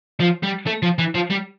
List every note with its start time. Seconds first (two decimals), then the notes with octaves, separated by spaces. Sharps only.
0.20 F3
0.43 G3
0.66 A3
0.82 F3
0.99 E3
1.15 F3
1.30 G3